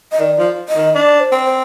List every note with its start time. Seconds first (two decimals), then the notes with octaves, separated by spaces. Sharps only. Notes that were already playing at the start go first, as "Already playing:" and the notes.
0.12 D#5
0.19 D#3 D5
0.39 F3
0.69 D#5
0.76 D#3
0.95 D4 D5
1.20 C5
1.32 C4
1.45 C5